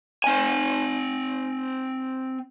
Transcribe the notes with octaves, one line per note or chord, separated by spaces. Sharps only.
C4 G#5